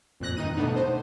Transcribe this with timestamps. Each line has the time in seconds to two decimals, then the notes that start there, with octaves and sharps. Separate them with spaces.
0.20 F2 A#2 F#6 A#6
0.37 G2 D#3 D#4 D#7
0.56 B2 A3 B3 D4 D#4
0.76 C5